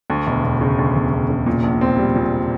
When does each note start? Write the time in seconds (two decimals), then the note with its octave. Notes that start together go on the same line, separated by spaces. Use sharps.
0.10 D2
0.27 E1
0.44 E1
0.61 C#3
0.78 D2
0.96 E1
1.13 E1
1.30 C#3
1.46 A#2
1.64 A#1
1.81 C4
1.98 G3
2.16 A#2